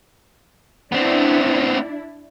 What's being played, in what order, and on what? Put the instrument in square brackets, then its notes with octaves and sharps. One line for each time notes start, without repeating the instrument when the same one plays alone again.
[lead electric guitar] B3 C4 [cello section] D4 E4